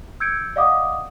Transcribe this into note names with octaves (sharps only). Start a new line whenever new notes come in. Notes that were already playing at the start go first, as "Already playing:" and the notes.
E6 G6 G#6 C#7 D7
D5 D#5 F5 F#5 D6 D#6